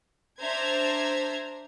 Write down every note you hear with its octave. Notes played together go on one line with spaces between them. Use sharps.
D4 C5 E5 A#5 G#6